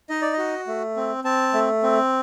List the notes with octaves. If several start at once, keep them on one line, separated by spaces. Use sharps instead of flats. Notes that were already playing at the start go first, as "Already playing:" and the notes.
D#4 D#5
D5
F#4 D#5
A3
C4
C4 A5
A3
C4